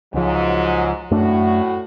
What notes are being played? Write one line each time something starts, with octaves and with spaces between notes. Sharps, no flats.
C#2 G#2 F3 F#3
F#2 A2 A3 D4 F#4